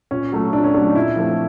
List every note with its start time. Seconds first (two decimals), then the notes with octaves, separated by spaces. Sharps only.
0.11 A#2 C#4
0.32 F#3 A3
0.53 A#2 D4
0.64 C#4
0.74 F#3 A3 D4
0.88 D#4
0.95 A#2 E4
1.16 F3 A3 C4